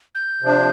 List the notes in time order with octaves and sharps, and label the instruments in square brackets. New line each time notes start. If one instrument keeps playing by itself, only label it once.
[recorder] G6
[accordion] C3 F3 D4